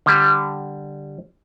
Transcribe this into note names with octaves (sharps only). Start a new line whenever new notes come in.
D3 G3